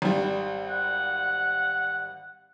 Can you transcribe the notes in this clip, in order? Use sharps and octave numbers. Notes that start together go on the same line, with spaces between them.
G#1 G3
F#5